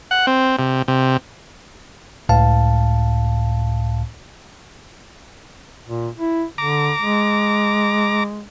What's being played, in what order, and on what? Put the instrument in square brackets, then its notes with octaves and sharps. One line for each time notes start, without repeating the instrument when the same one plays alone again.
[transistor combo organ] F#5
C4
C3
C3
[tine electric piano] C#2 A2 F5 A5
[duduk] A#2
E4
[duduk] D3 [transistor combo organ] A#5 D6
[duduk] G#3